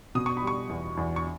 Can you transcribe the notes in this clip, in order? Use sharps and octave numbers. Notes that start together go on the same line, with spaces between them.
B2 D#6
C#6
B5
G3 C#6
E2
E2
C#6